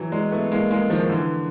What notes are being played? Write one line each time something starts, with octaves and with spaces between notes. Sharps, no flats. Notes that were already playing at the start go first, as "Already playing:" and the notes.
Already playing: E3 F#3
F#3 G#3
A3 B3
G#3 A#3
G#3 A#3
D#3 F3
D3 E3